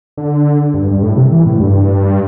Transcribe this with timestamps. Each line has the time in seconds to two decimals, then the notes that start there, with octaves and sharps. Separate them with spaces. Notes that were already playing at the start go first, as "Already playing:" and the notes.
0.17 D3
0.74 G2
0.91 G2
1.03 A2
1.17 C3
1.32 E3
1.46 A2
1.60 G2